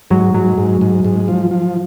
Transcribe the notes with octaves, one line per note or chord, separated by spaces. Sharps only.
G#2 F#3
G#2 F#3
G#2
G#2
G#2
F3
F3